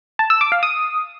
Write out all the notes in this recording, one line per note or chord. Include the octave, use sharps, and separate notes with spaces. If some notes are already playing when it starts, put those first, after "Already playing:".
A5
E6
D6
F5
D#6